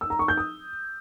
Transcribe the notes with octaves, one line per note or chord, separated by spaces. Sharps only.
E6
A#5
C#6
G6
D#6